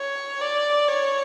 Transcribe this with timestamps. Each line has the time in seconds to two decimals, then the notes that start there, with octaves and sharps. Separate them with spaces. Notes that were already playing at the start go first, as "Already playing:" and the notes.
Already playing: C#5
0.41 D5
0.88 C#5